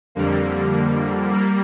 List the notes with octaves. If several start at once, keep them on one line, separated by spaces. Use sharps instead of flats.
F2 D3 G3 A#3
G3 A#3